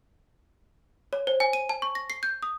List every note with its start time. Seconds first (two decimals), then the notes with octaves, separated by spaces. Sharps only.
1.13 C#5
1.27 C5
1.40 G#5
1.53 D#7
1.69 A5
1.82 C#6
1.95 A#6
2.10 C7
2.23 G6
2.43 D#6